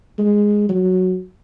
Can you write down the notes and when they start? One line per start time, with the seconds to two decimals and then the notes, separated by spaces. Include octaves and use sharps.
0.18 G#3
0.69 F#3